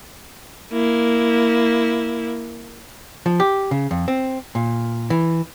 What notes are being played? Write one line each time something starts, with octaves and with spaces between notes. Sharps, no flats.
A#3 E4
F3
G4
C#3
F2
C4
A#2
E3